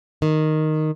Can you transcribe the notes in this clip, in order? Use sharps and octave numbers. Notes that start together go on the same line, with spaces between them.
D#3